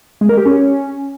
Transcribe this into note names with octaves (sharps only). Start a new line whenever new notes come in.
G#3
A#4
G4
C#4